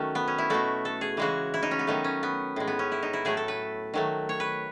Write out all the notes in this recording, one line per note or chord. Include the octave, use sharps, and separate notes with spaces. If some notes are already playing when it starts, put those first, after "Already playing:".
Already playing: D#3 F#3 A3 C#4
B3
C#4
E4
B2 A3 F#4
A4
G#4
C#3 E3 G#3 F#4
E4
D#4
C#4
B3
D#3 F#3 A3 D#4
C#4
B3
A2 G#3
B3
C#4
E4
D#4
E4
A2 F#3 A3 G#4
A4
B4
D#3 F#3 A3
C#5
B4